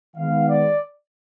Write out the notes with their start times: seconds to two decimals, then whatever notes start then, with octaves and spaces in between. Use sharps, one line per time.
0.16 D#3 G#3 B3 F5
0.49 D5